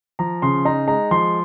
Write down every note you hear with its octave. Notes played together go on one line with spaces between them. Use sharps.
F3 A#5
C#3 C6
D#4 A#5
G#3 A#5
F3 C6